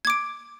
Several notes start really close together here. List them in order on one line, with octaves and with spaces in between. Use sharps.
G#6 D6 D7